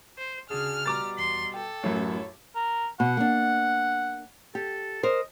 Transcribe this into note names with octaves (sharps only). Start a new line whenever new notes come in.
C5
D2 C#3 D4 F#4 G#4 F6
B2 G3 A#5 D6 A6
E2 C6
A4 G5
A1 F#2 A3 C#4 E4 A#4 C#5
A#4
B2 F#5
A#3 D4
G4 A4
A#4 C5 D#5